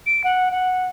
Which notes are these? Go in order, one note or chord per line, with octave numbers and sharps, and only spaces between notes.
D7
F#5
F#5